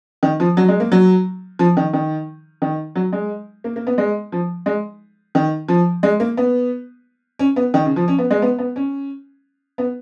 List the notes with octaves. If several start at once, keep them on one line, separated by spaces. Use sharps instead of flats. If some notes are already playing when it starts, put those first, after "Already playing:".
D#3
F3
F#3
G#3
A#3
F#3
F3
D#3
D#3
D#3
F#3
G#3
A#3
A#3
B3
G#3
F3
G#3
D#3
F3
G#3
A#3
B3
C#4
B3
D#3
C#3
F3
C#4
B3
G#3
B3
B3
C#4
B3